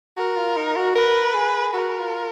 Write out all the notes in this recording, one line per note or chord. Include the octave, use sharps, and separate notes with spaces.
F#4 A#4
F4
D#4
F#4
A#4 B4
G#4
F#4 A#4
F4